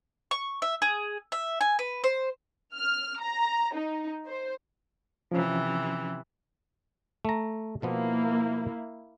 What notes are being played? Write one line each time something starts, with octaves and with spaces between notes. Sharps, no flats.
C#6
E5
G#4
E5
G#5
B4
C5
F6
A#5
D#4
C5
C3 E3 F3 C#4
A3 A#5
B2 F3 A#3 B3 E4